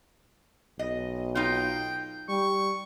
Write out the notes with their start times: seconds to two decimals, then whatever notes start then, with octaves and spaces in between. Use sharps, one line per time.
0.79 B1 D#5
1.35 D#4 F4 G5
2.29 G3 C#6